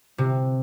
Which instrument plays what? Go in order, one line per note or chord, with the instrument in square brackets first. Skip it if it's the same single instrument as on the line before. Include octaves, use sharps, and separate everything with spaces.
[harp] C3